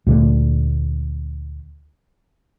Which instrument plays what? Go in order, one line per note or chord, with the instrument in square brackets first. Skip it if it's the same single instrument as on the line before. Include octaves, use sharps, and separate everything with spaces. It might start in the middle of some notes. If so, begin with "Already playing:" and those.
[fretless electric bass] D2 A#2 D3 A3